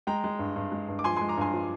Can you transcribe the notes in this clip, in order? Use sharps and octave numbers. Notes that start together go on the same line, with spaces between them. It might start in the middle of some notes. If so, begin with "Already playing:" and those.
G#3 G5 A#5
G#3
G2
G2
G#3
G2
D6
F3 G#5 C6
G#5 C6
G#3
A#5 D6
G2 G#5 C6
F3